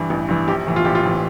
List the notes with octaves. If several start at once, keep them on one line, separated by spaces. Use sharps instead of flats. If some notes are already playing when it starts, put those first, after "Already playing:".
Already playing: G2 E3
A1
G2 E3
A#1 G4
A2 E3
F4
A#1 G4
F4
A2 E3